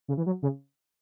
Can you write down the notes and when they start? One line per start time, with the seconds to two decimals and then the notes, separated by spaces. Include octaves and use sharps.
0.08 C#3
0.17 E3
0.26 F#3
0.42 C#3